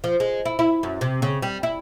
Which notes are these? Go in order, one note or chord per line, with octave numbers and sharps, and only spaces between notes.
F3
G#3
E4
E4
F#2
C3
C#3
G3
E4